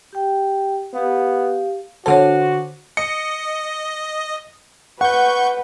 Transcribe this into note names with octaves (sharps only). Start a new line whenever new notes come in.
G4 G5
B3 G4 F5
D3 F#4 A4 C5 C#5 F#5 A5
D#5 C#7
B4 F#5 C#6 G6